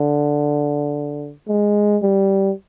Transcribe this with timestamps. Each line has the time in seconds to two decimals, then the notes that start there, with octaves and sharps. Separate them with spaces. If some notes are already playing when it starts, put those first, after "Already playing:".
Already playing: D3
1.48 G#3
2.02 G3